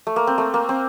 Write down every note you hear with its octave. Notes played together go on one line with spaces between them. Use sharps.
A3
A#3
C4
A3
A#3
C4